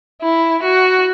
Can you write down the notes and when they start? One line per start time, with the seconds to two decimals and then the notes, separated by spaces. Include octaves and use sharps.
0.22 E4
0.63 F#4